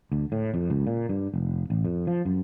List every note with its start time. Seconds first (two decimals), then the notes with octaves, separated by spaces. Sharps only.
0.12 D2
0.32 A2
0.54 F2
0.70 C#2
0.87 A#2
1.09 G2
1.34 F1
1.70 A1
1.85 F2
2.07 F3
2.25 F#2